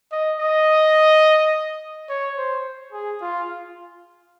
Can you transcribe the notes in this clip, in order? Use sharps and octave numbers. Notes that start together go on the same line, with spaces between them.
D#5
D#5
C#5
C5
G#4
F4